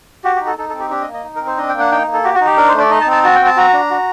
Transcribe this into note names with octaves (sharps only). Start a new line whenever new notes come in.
F#4 G4
D#4 G4
A4
D#4 A4
C4 A4
G4
D4 G4
D#5
A#3
D#5
D#4
A#4
C4
C5
D4 D#5
A#3 G5
F#5
D#4 G5
A#3
A4
F#4 G4
F#4
D#4
G4
D4 A#4
C5
A3
D5
D#4 D#5
A5
C4
A5
F#4 A5
G5
C4
A5
F#4 A#5
D4
F#4